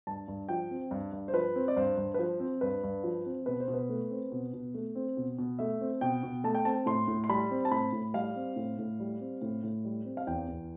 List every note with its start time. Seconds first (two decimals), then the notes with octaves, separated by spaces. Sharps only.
0.07 G2 A5
0.28 G2
0.49 F3 G5
0.71 C4
0.91 G2
1.12 G2
1.28 C5
1.34 F3 B4
1.56 C4
1.68 D5
1.77 G2 C5
1.97 G2
2.14 B4
2.19 F3 C5
2.40 C4
2.61 G2 B4
2.83 G2
3.04 F3
3.26 C4
3.46 B2 B4
3.60 C5
3.68 B2
3.74 B4
3.89 A3
4.11 C4
4.32 B2
4.53 B2
4.74 A3
4.95 C4
5.17 B2
5.38 B2
5.59 A3 E5
5.81 C4
6.01 B2 G5
6.23 B2
6.44 A3 A5
6.55 G5
6.65 C4 A5
6.86 A2 C6
7.08 A2
7.24 C6
7.29 G3 B5
7.51 C4
7.65 A5
7.71 A2 B5
7.92 A2
8.14 G3 F5
8.36 C4
8.56 A2
8.78 A2
9.00 G3
9.20 C4
9.42 A2
9.63 A2
9.85 G3
10.05 C4
10.17 F5
10.27 E2 G5
10.48 E2